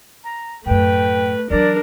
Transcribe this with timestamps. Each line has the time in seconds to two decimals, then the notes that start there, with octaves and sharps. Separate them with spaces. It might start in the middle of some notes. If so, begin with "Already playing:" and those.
0.24 A#5
0.66 F#2 A2 A3 B4 G5
1.50 E3 F#3 D4 A#4 D5